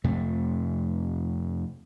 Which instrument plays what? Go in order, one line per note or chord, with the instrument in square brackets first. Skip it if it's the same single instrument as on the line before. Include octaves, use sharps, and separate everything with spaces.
[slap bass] F2 C3 A3